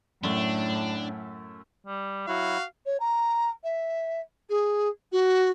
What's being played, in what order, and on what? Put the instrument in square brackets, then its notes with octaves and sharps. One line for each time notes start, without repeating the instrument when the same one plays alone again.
[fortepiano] F#2 A3 [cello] A2 [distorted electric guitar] D4
[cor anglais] G3
[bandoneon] F#3 E4 [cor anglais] F#4 [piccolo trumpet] F5
[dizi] C#5
A#5
E5
G#4
F#4